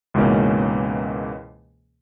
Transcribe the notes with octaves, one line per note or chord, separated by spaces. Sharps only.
C#2 G#2 B2 E3 A#3 C#4